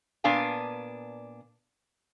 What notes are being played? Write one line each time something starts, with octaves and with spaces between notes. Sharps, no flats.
A#2 B3 D4 F5 G#5